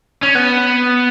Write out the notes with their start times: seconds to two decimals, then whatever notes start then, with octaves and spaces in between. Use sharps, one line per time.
0.23 C#4
0.36 B3